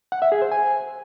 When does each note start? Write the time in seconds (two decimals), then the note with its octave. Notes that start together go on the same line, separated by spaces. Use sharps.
0.12 F#5
0.22 E5
0.32 G#4
0.42 C5
0.52 G#5